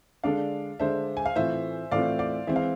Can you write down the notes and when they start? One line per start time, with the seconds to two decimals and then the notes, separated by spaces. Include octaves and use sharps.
0.24 D3 G#3 D4 A4 D5 F5
0.79 D3 G#3 D4 A4 C5 E5
1.17 G#5
1.26 F5
1.36 A2 E3 A3 C4 F4 C5 E5
1.91 A2 E3 A3 C4 F4 D5 F5
2.19 D5 F5
2.47 E3 G#3 C4 E5
2.56 F5